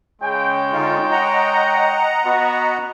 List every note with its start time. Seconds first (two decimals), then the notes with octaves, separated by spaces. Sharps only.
0.22 C#3 G#3 C#5 G5
0.72 D3 D#4 F4
1.11 D#5 F#5 A#5
2.24 B3 F#4